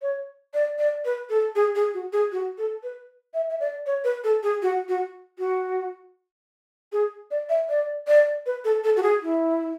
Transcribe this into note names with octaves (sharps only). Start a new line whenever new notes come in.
C#5
D5
D5
B4
A4
G#4
G#4
F#4
G#4
F#4
A4
B4
E5
E5
D5
C#5
B4
A4
G#4
F#4
F#4
F#4
G#4
D5
E5
D5
D5
B4
A4
A4
F#4
G#4
E4